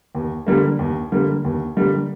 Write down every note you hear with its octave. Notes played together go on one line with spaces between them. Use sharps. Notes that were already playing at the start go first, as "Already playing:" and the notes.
D#2
D3 G3 A#3
D#2
D3 G3 A#3
D#2
D3 G3 A#3